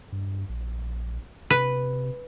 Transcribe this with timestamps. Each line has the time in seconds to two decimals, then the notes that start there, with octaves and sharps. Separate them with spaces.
0.12 G2
0.49 A#1
1.50 C3 B4